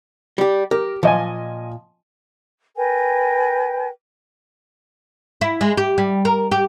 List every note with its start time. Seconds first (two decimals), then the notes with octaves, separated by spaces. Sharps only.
0.38 G3 G4
0.71 G4 A#4
1.03 A#2 F3 D#5 G#5
2.76 A#4 B4 G5 G#5
5.41 E4
5.61 G#3
5.77 G4
5.98 G3
6.25 A#4
6.51 G4